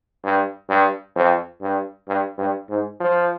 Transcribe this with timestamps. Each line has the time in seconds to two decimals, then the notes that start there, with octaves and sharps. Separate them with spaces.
0.24 G2
0.69 G2
1.16 F2
1.61 G2
2.08 G2
2.38 G2
2.69 G#2
3.00 F3